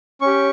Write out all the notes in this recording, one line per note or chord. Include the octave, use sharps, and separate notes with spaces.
C#4 G4 C#6